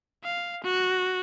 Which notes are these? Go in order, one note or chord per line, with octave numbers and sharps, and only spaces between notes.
F5
F#4